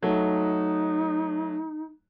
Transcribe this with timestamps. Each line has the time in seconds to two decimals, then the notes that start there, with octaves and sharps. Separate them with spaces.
0.02 F#3 A3 D#4